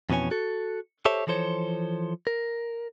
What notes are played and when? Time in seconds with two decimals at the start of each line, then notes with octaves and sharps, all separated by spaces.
0.10 F2 B2 E3 C#4 G#5
0.31 F#4 A4
1.05 G4 A4 C5 C#5 E5 A5
1.27 E3 F3 A4 C5 C#5
2.27 A#4